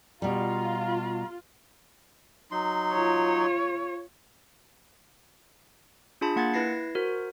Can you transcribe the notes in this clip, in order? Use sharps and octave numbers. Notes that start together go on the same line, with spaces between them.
B2 G3 F4 A#5
F#3 D#4 C6
F4 C#5
D4 F4 G#4 A5 B5
A#3 F#5 G#6 A6
E4 B4 G#6 A#6 C7
F#4 A#4 C5